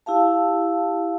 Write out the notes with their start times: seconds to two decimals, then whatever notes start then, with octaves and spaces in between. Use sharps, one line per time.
0.06 E4 G4 F5 A5